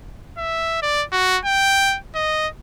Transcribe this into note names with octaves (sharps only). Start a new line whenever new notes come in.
E5
D5
F#4
G5
D#5